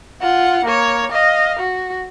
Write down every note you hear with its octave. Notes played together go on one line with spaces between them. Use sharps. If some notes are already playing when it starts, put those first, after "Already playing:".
F4 F#5
A#3 C#5
D#5 F5
F#4